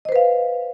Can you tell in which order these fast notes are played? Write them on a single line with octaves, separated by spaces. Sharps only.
D#5 C5 B4 F5